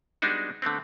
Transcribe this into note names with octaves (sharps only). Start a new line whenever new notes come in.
G3 G#3 B3 D4 D#4 F#4
D3 A3 B3 C4